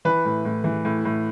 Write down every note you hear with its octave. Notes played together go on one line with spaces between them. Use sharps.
E3 B4
A2
A2
E3
A2
A2